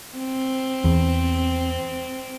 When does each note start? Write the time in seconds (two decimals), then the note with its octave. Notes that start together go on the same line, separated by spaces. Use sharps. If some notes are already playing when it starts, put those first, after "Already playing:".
0.17 C4
0.84 E2